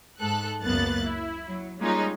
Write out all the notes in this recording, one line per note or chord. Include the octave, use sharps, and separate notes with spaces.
G#2 A4 F#6
C#2 F#2 A#3 B3 F#6 A6
E4
F#3
G3 G#3 A#3 C#4 D#4 F4